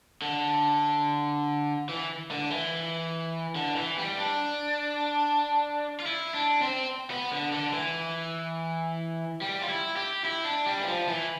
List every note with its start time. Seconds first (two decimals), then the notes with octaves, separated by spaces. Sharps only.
0.22 D3
1.89 E3
2.31 D3
2.51 E3
3.55 D3
3.76 E3
3.98 G3
4.18 D4
6.00 F4
6.06 E4
6.34 D4
6.62 C4
7.10 B3
7.32 D3
7.52 D3
7.73 E3
9.41 G3
9.62 F4
9.69 E4
9.96 G4
10.24 E4
10.45 D4
10.66 G3
10.80 E3
10.88 F3
11.08 E3